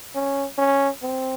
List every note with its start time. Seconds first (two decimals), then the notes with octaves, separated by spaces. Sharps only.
0.15 C#4
0.58 C#4
1.03 C4